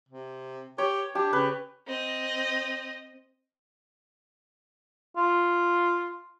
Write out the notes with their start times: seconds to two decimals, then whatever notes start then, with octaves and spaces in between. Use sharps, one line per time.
0.09 C3
0.78 G4 C#5
1.15 D4 G4
1.33 C#3 B4
1.87 C4 D#5
5.17 F4